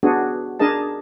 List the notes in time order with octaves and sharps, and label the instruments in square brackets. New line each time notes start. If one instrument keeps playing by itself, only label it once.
[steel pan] B3 D4 F#4 G#4
D4 G#4 A#4 D#5 A5